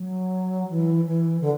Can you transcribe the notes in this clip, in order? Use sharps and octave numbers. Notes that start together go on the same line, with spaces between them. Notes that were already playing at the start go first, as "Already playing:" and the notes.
Already playing: F#3
E3
E3
D3